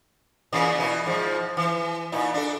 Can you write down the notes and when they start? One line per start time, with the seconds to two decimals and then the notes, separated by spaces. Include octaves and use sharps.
0.53 A#2 C#3 E3
0.78 B2 E4
1.06 G#2 F3
1.57 E3
2.12 A#2 D#4 E4
2.34 D4 A4